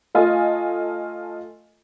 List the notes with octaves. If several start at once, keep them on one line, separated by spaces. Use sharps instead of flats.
A3 F4 D#5 G#5